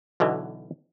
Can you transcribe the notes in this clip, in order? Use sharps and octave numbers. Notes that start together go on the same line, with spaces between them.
B1 B2 D3 E3